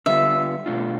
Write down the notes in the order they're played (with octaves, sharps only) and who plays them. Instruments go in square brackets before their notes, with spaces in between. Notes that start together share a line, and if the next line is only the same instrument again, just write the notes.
[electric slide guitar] D3 G3 B3 F4 [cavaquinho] E5
[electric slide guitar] B2 A3 D4 F4